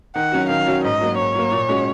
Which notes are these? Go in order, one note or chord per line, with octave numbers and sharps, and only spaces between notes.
D#3 F#5
F#3 C#4 F#4
D#3 F5
F#3 C#4 F#4
G#2 D#5
F#3 A#3
G#2 C#5
F#3 A#3
A#2
G#3 C#4 F#4